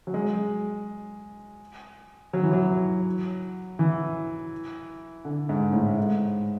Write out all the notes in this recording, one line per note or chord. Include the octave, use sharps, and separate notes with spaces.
F#3
G#3
F#3
E3
F#3
E3
D3
G#2
A2
G#2